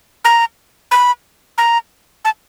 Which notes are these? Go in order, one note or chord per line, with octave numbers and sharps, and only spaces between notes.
A#5
B5
A#5
A5